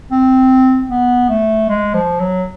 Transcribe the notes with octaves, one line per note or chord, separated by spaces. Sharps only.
C4
B3
A3
G#3
F3
F#3